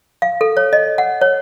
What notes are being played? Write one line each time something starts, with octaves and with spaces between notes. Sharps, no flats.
F5
A4
C#5
D#5
F#5
C#5